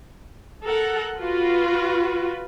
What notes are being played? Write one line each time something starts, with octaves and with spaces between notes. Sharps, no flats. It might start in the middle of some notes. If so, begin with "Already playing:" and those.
A4 A#4 F#5
F4 F#4 B4